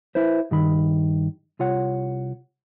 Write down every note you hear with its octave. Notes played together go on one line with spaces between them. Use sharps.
E4 B4 C5
G2 D#3 B5
C2 F4 C#5 F#5